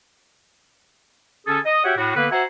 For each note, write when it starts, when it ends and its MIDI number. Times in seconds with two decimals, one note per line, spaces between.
1.47 1.59 50
1.47 1.59 61
1.47 1.59 68
1.47 1.59 69
1.66 1.84 75
1.85 1.94 66
1.85 1.94 67
1.85 1.94 73
1.85 1.94 76
1.85 1.94 78
1.85 1.94 79
1.97 2.13 45
1.97 2.13 66
2.16 2.27 50
2.16 2.27 58
2.16 2.27 59
2.16 2.27 71
2.32 2.43 66
2.32 2.43 72
2.32 2.43 76
2.32 2.43 78
2.32 2.43 80
2.32 2.43 82